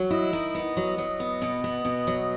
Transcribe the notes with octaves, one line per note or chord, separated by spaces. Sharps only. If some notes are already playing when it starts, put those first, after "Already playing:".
Already playing: F#3
E4 D#5
D#3
B3
F#3
F#3
B3
B2
B3
B2
F#3